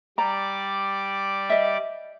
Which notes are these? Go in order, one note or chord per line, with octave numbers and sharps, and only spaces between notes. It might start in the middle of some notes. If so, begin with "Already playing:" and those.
G3 D5 A#5 D6
D#5 E5